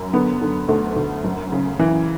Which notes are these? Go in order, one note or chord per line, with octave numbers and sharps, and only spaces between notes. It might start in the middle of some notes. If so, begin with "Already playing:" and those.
Already playing: F#2
D3 B3
D3
D2 A3
D2
F#2
C#3
E3